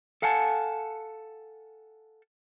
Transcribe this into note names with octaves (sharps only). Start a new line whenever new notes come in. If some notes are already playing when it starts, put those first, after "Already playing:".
A4 F5 F#5 G#5 A5